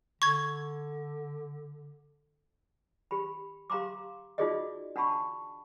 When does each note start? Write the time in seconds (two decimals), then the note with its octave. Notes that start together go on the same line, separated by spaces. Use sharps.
0.22 D3 C#6 G#6
3.11 G4 B5
3.70 G4 F5 A#5 C6 D6
4.38 D#4 F4 F#4 G#4 D5 D#5
4.96 D4 F#5 A5 B5 C#6